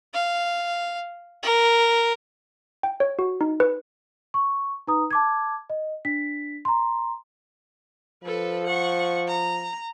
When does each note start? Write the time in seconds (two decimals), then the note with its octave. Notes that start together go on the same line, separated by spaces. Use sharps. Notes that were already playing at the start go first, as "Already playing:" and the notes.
0.14 F5
1.43 A#4
2.83 G5
3.00 C#5
3.19 F#4
3.41 D#4
3.60 B4
4.34 C#6
4.87 D#4 B4 A#5 D#6
5.11 A5 D6 G#6
5.70 D#5
6.05 D4 B6
6.65 A#5 C6
8.24 F3 A4 B4
8.66 F#5 C#6
9.28 A#5